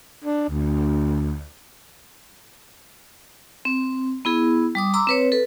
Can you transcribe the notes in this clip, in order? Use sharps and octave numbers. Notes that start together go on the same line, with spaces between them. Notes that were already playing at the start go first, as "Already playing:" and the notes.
D4
D2
C4
B3 E4 G#4
G3 D6 D#6
A#5 C6 D6 E6
C4 B4 C#5
A4 B4